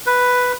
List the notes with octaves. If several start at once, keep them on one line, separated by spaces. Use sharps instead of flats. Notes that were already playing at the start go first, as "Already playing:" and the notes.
B4